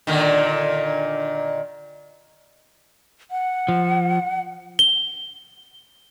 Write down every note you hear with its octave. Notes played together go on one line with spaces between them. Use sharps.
A#2 D3 D#3
F#5
F3
G7